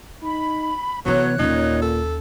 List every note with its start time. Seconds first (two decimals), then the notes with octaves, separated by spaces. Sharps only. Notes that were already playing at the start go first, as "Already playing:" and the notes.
0.23 D#4 B5
1.06 C3 E3 F#3 B3 C#5 F#6
1.39 D#2 A#2 C#4 D#4
1.82 A4